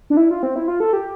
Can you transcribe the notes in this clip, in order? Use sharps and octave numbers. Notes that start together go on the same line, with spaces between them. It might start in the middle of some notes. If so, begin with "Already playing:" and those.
D4
E4
F4
C4
E4
F4
A4
G4